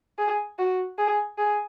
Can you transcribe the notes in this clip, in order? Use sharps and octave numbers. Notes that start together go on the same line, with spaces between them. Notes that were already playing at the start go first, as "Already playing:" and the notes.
G#4
F#4
G#4
G#4